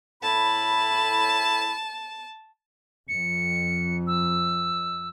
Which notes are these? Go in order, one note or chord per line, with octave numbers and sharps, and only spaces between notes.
A2 E4 A5 B5
F2 C#7
E6